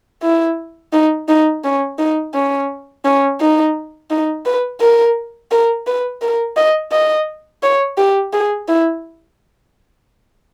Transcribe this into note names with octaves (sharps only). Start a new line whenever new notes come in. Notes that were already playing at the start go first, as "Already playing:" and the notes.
E4
D#4
D#4
C#4
D#4
C#4
C#4
D#4
D#4
B4
A#4
A#4
B4
A#4
D#5
D#5
C#5
G4
G#4
E4